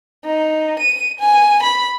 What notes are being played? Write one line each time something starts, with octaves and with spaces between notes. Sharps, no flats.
D#4
D#7
G#5
B5